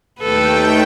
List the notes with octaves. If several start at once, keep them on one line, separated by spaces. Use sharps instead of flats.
D#2 A3 A4 B4 G5